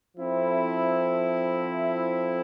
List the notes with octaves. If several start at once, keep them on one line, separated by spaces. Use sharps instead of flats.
F3 C4 E4 A4